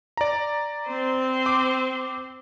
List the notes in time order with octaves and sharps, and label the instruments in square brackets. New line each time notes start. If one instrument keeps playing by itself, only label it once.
[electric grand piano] D5 A#5
[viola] C4 C5
[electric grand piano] D6